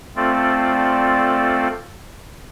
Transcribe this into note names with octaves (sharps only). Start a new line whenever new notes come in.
A3 C4 F4 A4 D5